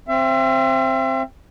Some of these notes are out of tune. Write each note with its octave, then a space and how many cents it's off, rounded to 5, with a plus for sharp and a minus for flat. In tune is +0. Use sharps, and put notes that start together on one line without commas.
C4 +10 E5 +40